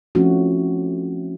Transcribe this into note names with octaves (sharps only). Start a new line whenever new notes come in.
F3 A3 C4 C#4 E4 F#4